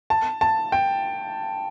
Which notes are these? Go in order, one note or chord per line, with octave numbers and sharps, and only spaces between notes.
A5
A5
G5